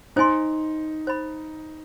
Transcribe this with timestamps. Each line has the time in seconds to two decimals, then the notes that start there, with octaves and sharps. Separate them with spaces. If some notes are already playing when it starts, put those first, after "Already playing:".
0.16 D#4 C5 D#5 G#5 C6
1.07 C5 D#5 B5